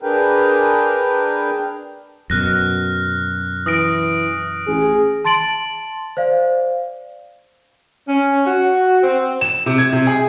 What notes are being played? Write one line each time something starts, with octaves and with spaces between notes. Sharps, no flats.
D4 G#4 A#4 B4 G5
F#2 B2 F6 F#6 A#6
E3 D#6 A#6 D7
A1 G#4
A5 C6 A6 D7 F#7
C5 D5 F5
C#4
F#4
C4
E7
C3
G#6
C3
G#4